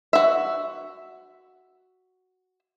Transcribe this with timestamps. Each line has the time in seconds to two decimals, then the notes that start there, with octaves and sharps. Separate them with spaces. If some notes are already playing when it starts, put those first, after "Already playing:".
0.13 F#4 E5